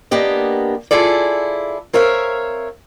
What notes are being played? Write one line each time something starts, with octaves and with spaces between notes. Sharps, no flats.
A#3 B3 D4 G4 D#5
E4 F4 G#4 A4 D5
C4 A#4 C#5 E5 F5